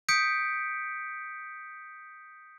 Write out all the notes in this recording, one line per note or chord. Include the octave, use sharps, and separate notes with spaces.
D#6 G6 B6 C#7 D7